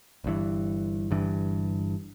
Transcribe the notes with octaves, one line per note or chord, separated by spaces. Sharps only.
G1 G2 E3
G1 G2 E3